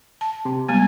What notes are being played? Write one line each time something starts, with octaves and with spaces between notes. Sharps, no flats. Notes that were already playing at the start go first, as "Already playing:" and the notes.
A5
C3
G3 G#3 B3 G#5